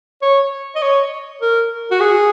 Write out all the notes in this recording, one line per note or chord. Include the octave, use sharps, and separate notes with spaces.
C#5
D#5
C#5
A#4
F#4
G#4